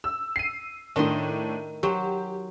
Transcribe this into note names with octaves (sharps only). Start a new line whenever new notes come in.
E6
C7 D#7
A2 D#3 D4 D#5 C6
F#3 G4 C5